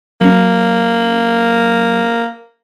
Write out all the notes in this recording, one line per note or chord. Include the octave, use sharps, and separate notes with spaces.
F#3 A#3 C#4